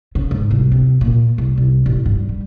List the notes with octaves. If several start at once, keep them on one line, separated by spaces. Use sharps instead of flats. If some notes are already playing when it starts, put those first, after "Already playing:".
C#3
G#2
C2
C3
A#2
C2
C2
A1
G2
G3